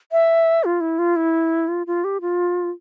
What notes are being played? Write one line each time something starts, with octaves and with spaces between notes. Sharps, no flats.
E5
F4
E4
F4
E4
F4
F4
G4
F4